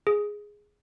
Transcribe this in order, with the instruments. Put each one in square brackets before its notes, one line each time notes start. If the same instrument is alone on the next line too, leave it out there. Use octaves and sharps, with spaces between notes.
[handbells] G#4